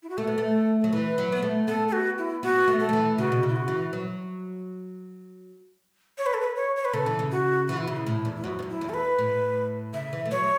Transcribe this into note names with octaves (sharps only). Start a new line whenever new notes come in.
E4
F#4
A3 A4
B3
A3
F#3 A4
E3 B4
F#3
B3
A3
B3 A4
A4
F#4
E4
B3 F#4
A3
A4
F#3
E3
C#3 F#4
B2
C#3
E4
F#4
E3
F#3
C#5
B4
A4
B4
C#5
C#5
B4
C#3 A4
E3
C#3
F#4
E3 F#4
E4
C#3
E4
A2
E2
E4
F#2 F#4
E2
F#2
E4
E2
A4
B4
A2
C#3 E5
E3
A3
F#3 C#5